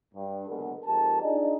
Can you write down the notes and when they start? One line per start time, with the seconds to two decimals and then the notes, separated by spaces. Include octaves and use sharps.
0.14 G2
0.48 F#1 B2 D3 G#3 B3 A#4
0.85 F2 G#2 G4 A#4 A5
1.22 D4 D#4 F4 G#4 D5 D#5